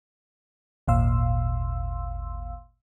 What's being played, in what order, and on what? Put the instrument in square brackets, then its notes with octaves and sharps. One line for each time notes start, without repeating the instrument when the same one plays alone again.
[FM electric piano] G#1 D#2 A#2 F5 C6 E6